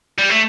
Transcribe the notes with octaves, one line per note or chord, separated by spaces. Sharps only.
G3
A3